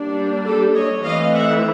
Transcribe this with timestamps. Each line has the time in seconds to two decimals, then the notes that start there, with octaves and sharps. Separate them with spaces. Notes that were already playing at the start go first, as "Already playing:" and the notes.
Already playing: G3 A#3 D4
0.46 G4 A4
0.76 C#5 D#5
1.05 E3 A3 C4 D#5 F5
1.34 E5 F#5